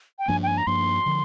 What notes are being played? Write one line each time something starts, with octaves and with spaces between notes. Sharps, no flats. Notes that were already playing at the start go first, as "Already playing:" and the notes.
G5
G2 F3 A#3 D4 G#5
G5
G#5
A#5
G2 F3 A#3 D4 C6
D3 F3